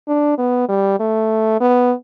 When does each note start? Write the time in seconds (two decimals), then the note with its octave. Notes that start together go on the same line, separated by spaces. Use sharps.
0.08 D4
0.38 B3
0.69 G3
1.00 A3
1.61 B3